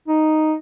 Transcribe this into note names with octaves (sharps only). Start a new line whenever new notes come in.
D#4